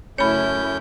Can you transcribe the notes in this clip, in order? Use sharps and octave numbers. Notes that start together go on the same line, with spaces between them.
F#2 C#3 A3 C#4 E4 C#5 B5 G6